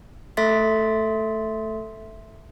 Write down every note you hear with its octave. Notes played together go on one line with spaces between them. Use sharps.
A3 A4 E5 C6 A6 B6